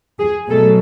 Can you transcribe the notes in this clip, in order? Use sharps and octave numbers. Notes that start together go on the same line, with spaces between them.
G#4
B2 F#3 A3 A4